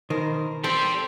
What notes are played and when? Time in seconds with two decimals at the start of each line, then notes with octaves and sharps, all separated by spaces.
0.10 B2 D#3 A#4 C5
0.64 C4 G4 A4 D5